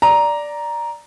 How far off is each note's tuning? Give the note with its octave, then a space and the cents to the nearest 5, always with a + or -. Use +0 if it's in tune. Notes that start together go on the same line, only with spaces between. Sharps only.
D5 +0 A#5 +5